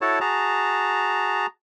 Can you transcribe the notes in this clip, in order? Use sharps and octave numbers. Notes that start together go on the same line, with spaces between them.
E4 F#4 A4 C#5 A5
F#4 G#4 A5 A#5